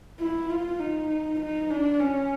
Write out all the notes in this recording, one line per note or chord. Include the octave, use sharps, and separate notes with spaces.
E4
F4
D#4
D#4
D4
C#4